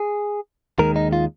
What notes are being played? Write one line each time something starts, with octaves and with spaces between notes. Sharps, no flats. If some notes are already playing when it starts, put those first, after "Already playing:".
Already playing: G#4
D#2 D#3 G#3 A#4
D#4
F4